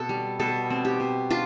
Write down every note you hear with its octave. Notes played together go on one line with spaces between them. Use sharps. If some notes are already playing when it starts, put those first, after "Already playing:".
Already playing: B2 C4 A4
G3
B2 A4
C4
G4
B2
D4 F4